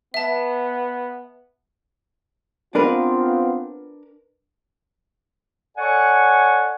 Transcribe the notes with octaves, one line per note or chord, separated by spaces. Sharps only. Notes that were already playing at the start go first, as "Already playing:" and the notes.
B3 E5 A5
B3 C4 D4 F4 A#4 B4
A4 C#5 D5 F#5 G#5 C#6